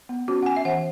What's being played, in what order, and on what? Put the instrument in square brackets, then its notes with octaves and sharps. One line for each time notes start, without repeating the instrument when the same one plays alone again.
[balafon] B3
C#4 F#4
F#5
C#4 G#5
E5
E3 F#5